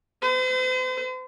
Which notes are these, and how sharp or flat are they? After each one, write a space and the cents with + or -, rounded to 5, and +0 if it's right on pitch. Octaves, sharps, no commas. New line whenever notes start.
C5 -40